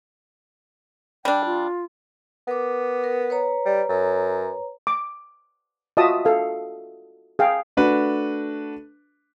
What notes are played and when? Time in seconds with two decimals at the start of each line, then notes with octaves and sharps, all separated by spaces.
1.25 G3 D4 G5
1.45 F4
2.48 B3 A#4 D6
3.04 A#4
3.30 B4 C#5 A#5
3.65 G3
3.89 F#2
4.87 D6
5.97 F4 F#4 D#5 E5 A5 D#6
6.25 A4 F5
7.39 G#4 F5 G5
7.77 A3 D4 F#4 B4